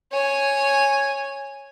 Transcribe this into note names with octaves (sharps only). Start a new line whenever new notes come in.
C#5 G#5